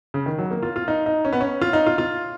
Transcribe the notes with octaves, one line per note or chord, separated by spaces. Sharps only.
C#3
D#3
F#3
A#3
F4
F4
D#4
D#4
C#4
B3
C#4
F4
D#4
F4
F4